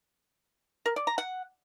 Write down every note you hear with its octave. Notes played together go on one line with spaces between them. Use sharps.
A#4
D5
A#5
F#5